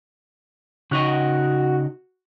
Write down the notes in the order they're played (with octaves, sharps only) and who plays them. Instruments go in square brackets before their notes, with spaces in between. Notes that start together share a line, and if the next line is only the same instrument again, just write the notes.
[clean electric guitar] C#3 D#4 D#5 [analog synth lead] F#4